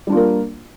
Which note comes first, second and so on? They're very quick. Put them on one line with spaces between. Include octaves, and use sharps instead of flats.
G3 D4 F4 A#3 A#4